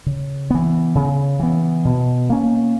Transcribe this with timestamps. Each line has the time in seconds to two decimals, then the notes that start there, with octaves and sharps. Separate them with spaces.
0.06 C#3
0.50 E3 B3
0.95 C#3
1.40 E3 B3
1.85 B2
2.30 A#3 C#4